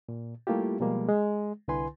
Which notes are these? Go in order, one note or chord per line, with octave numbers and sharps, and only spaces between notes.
A#2
G3 A3 A#3 E4 F4 G4
B2 F3 G3 G#3 A#3
G#3
C2 D3 E4 B4 G#5 C6